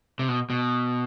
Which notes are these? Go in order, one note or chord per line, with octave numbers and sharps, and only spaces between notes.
C3
B2
B2